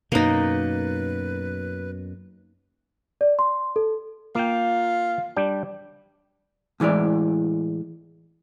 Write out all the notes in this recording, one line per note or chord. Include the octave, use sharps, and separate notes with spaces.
F#2 B2 A#3 D#4 B4
D5
C6
A4
A#3 F4 G5
G3 D4 G5
A2 E3 G#3 E4 D5